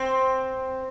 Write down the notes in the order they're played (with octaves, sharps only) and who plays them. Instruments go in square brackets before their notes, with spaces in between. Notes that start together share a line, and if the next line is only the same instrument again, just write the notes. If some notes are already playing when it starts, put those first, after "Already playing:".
Already playing: [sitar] C4